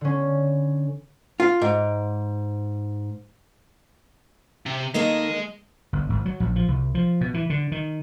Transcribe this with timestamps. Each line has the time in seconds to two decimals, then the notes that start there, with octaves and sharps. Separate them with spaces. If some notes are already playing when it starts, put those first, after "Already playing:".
0.01 D3 C#4
1.40 F4
1.61 G#2
4.66 C3
4.94 D#3 G#3 A#3 A4 D#5
5.93 G1
6.10 G#1
6.26 F#3
6.40 A#1
6.56 F3
6.68 C2
6.95 F3
7.21 B2
7.34 E3
7.50 D3
7.72 D#3